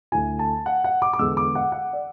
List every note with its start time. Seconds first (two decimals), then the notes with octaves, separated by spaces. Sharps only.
0.12 D2 D3 A3 E4 G#5
0.39 A5
0.66 F#5
0.84 F#5
1.02 D6
1.13 D6
1.19 E2 D3 G#3 B3 E6
1.37 D6
1.55 F#5
1.72 F#5
1.93 D5